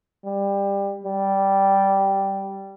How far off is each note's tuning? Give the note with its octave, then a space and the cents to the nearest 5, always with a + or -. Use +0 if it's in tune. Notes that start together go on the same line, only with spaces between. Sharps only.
G3 +20
G3 -10